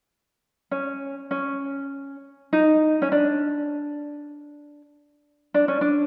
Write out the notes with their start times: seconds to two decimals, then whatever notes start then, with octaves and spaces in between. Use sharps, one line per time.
0.71 C#4
1.31 C#4
2.53 D#4
3.02 C#4
3.12 D4
5.54 D4
5.68 C#4
5.81 D4